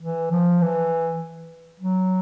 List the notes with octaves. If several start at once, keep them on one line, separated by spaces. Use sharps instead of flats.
E3
F3
E3
F#3